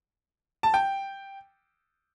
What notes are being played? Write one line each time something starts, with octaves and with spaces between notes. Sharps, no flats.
A5
G5